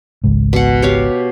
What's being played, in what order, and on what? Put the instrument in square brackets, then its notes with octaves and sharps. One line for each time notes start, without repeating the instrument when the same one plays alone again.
[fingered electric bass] G#1 C#2 G#2
[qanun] B2 F#5
G4 C#5 F5